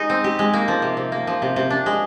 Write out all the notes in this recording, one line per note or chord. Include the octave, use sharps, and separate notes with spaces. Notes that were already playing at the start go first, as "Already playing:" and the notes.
Already playing: G#3 D#4
C4
G4
G#3
A#3
F3
C3
C3
A#3
F3
C3
C3
D4
G#3